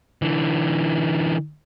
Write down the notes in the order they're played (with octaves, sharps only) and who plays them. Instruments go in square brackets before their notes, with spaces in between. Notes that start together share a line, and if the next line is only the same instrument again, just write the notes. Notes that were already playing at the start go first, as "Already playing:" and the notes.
[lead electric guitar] D3 E3